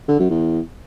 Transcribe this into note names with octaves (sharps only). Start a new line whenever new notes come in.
D3
F#2
E2